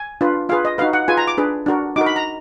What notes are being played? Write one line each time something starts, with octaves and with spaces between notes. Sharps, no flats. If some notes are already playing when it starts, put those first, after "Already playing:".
Already playing: G#5
D4 F4 B4
F4 G#4 B4 F5
D#5
D#4 F#4 B4 F5
F#5
F4 G#4 B4 G#5
A#5
D6
D4 G#4 B4
D4 F#4 A#4
D#4 F#4 A#4 D6
B5
A#5